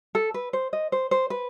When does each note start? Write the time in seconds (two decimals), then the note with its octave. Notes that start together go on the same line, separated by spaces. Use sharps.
0.15 A4
0.34 B4
0.53 C5
0.73 D#5
0.92 C5
1.11 C5
1.30 B4